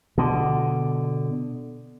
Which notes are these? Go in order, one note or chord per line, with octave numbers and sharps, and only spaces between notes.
B2 D3